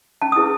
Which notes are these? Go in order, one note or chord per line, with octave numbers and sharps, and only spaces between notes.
C#4 A5
D#6
E4 G#4 B4